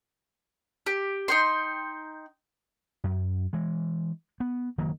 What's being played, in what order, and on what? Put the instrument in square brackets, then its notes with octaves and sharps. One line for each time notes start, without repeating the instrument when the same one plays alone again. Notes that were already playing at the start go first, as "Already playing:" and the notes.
[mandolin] G4
D#4 G5 C6
[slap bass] F#2
E3 G#3
B3
F#1 D#3 F#3 A#3